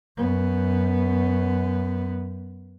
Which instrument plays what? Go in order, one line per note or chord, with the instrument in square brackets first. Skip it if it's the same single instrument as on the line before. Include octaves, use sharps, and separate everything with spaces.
[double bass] F#2 B3